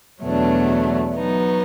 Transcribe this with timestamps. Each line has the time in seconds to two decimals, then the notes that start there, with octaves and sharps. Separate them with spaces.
0.22 E2 B2 F#3 A3 D4
1.16 F#3 B3 D#4